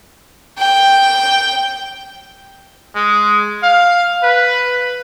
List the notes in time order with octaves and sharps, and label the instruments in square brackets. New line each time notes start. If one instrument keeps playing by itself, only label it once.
[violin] G5
[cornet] G#3
F5
B4